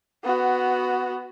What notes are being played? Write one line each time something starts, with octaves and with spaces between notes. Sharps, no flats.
B3 F#4